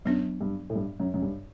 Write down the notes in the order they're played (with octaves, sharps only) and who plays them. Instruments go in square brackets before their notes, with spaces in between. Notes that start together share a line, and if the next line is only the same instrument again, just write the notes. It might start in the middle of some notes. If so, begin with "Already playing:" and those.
[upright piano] F#2 [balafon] F#3 B3 D4
[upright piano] G2
A2
G2
F#2
F#2
G2